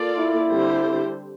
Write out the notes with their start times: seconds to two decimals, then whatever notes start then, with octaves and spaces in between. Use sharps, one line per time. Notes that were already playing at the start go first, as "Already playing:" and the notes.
Already playing: A#3 F4 A4 D5
0.18 E4
0.50 D3 G3 C4 G4 C5